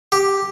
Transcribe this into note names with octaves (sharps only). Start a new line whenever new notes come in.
G4